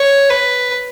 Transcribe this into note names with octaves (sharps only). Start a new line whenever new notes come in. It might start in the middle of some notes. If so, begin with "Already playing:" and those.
Already playing: C#5
B4